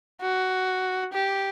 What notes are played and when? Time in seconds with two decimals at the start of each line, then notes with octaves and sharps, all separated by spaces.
0.22 F#4
1.13 G4